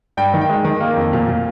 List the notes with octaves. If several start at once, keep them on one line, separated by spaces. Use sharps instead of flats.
G2 G5
D#3
G5
G#3
D#3
A#3
F2
A#2
A#2